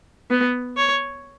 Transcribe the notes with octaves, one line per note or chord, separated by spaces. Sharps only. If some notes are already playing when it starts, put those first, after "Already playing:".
B3
C#5